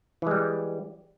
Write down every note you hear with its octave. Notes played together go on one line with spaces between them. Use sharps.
E3 G3 G#3